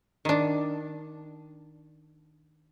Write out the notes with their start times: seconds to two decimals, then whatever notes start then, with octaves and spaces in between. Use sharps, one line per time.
0.25 D#3 D4